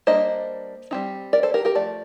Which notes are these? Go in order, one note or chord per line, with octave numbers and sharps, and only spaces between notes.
G3 A#3 D4 C5 D#5
G3 C4 D#4
A#4 D5
A4 C5
G4 A#4
G4 A#4
F3 A3 D5